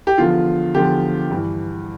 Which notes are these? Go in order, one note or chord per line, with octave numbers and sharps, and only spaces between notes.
G4
E2 D3 F3 F4
E2 D3 F3 G4
G2 E3